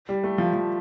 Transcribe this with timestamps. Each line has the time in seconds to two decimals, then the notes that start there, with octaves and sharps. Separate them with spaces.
0.09 G3
0.24 A3
0.38 F3
0.53 F3